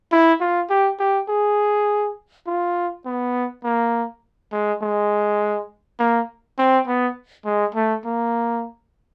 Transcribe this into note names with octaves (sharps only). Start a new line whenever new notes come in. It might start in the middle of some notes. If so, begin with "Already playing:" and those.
E4
F4
G4
G4
G#4
F4
B3
A#3
G#3
G#3
A#3
C4
B3
G#3
A3
A#3